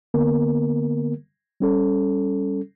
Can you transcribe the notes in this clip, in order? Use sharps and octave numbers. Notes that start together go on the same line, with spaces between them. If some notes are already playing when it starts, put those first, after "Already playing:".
D3 A#3 B3 A#4
G3 C#4 A4